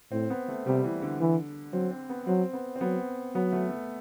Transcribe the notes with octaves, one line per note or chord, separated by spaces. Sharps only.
A2 C4
B3
A3
C3 G3
E3
D3
E3
F#3 C4
C4
B3
F#3 C4
B3
C4
F#3 B3
F#3 B3
A3
A3